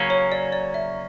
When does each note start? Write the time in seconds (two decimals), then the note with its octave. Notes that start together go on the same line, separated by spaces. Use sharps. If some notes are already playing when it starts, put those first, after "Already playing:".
Already playing: C#3 F#3 A#3 C#4
0.10 C#5
0.32 D5
0.52 D5
0.74 E5